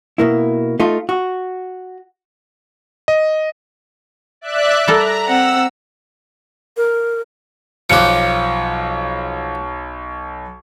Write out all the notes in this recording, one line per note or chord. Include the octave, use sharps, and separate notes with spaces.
B2 A#3 E4
A3 D#4 F4
F#4
D#5
D5 E5 F#6
G3 A4 A#4 A#5
C4 F#5 E6
A#4
B1 F3 G4 F#6 C#7